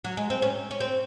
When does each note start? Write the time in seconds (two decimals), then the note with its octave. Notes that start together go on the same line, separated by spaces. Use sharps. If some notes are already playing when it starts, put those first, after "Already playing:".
0.04 F#3
0.17 G#3
0.30 C4
0.42 C#4
0.71 C#4
0.80 C4